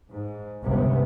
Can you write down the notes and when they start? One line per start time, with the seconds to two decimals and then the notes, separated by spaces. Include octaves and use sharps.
0.11 G#2
0.62 G1 C#2 C3 B3